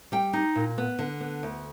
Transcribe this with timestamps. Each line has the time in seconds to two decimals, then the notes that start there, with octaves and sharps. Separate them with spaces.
0.12 G3 G5
0.33 D#4
0.56 A#2
0.78 B3
0.99 D3
1.20 B3
1.43 D2